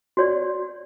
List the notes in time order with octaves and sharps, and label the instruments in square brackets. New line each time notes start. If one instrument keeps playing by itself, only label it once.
[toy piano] F#4 C#5 D5